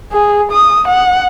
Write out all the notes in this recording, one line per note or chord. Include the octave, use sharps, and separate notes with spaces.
G#4
D#6
F#5